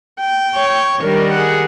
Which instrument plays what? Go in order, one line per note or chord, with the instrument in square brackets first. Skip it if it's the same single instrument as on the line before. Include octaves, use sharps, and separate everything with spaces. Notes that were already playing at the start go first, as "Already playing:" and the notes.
[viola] G5
[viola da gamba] C#5
[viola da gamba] D#3 G3 [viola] D4 A#4
[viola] G#4 F#5